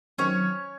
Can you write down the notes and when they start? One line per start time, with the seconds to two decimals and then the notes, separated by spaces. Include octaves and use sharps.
0.18 F#2 D#3 F#3 C4 C#4 C#5